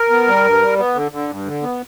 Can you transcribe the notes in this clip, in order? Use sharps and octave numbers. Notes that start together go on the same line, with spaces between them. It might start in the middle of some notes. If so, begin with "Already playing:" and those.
Already playing: A#4
B3
G3
G2
G3
B3
D3
D3
G2
D3
B3